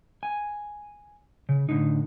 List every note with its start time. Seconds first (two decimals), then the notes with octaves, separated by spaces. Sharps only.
0.23 G#5
1.49 C#3
1.69 A2 D3 D#4